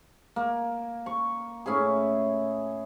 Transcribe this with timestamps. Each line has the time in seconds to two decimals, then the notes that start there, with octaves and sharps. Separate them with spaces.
0.36 A#3
1.06 C#6
1.66 A2 C#4 E4 G#4